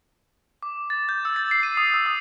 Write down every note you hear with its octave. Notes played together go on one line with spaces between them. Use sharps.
D6
A6
G6
E6
A6
C7
D#7
D#6
E6
D#6